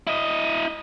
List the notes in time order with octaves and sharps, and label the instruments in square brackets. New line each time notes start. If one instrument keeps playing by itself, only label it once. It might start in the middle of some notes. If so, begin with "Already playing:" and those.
[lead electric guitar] E4 D#5